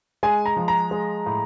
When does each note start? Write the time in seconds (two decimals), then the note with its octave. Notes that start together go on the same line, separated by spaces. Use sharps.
0.23 G#3 G#5
0.46 A#5
0.57 F3
0.68 A#5
0.91 G#3
1.26 A2